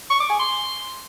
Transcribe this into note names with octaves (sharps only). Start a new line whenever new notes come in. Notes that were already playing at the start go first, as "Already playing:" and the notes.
C#6
D6
G#5
C6